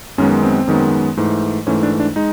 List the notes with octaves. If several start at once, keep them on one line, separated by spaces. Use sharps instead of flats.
F#2 D#3 G#3 B3 C#4
C4
F#2 D#3 G#3 B3
G#2 E3 A3
G#2 E3 A3 C#4
D4
D4
G#3 D#4